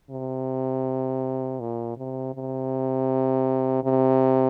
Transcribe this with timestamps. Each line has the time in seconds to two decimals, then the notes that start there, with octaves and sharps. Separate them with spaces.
0.10 C3
1.60 A#2
1.97 C3
2.35 C3
3.84 C3